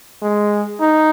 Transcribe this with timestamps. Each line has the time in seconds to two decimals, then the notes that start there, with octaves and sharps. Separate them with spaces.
0.23 G#3
0.81 D#4